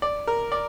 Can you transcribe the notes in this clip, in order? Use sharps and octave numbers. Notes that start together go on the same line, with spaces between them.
D5
A#4
D5